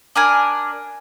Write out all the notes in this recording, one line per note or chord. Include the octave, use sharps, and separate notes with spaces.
D4 A#4 G#5